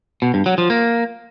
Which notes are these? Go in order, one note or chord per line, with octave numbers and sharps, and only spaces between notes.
B2
G2
F#3
F3
A#3